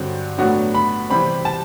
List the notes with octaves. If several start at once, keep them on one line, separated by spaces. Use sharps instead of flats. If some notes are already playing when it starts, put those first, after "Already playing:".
Already playing: G2 D3 F#3 C4 F#4
A2 F#3 B3 D4 F#4
B5
C3 E3 G3 C4 B5
A5